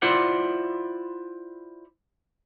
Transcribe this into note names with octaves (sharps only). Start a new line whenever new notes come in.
E4 F4 C5 D5 F#5